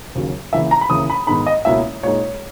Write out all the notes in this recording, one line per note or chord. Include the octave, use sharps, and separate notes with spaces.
D#2 C#3 F#3
C#3 E3 A#3 E5
A#5
B5
D#2 C#3 E3 D#6
B5
G#2 D#3 G#3 B3 D#4 B5
D#5
C#2 B2 A#3 C#4 E4 E5
A#2 G#3 D#4 C#5